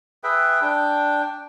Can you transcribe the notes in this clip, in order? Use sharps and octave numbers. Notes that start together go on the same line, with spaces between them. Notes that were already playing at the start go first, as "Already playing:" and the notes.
G#4 B4 E5 G5
D4 G5